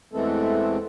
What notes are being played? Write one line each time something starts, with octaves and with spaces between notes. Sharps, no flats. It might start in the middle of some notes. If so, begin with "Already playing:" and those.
E2 E3 G#3 A3 C4 A4